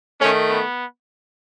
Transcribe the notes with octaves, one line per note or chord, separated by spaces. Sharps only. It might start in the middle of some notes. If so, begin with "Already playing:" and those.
D#3 A3 C#4
B3